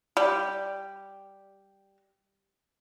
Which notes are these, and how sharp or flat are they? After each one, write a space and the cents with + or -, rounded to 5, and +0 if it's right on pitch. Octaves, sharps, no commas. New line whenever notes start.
G3 -5 G4 +0